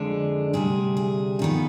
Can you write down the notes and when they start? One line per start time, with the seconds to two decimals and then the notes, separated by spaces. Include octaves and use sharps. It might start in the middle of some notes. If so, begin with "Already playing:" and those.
Already playing: F2 D3 G#3 D4
0.53 D2 C3 G3 G#4
0.97 G#4
1.39 F2 D#3 B3